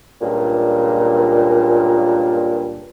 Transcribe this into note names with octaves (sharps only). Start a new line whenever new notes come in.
C#2 G2 A#2